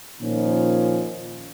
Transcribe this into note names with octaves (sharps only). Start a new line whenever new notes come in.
A#2 D#3 F3 C#4 D#4